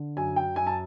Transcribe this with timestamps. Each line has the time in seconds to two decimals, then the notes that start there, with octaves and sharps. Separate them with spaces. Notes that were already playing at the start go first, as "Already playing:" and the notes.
Already playing: D3
0.17 F#2 G#5
0.36 G5
0.56 F#2 G#5
0.67 A5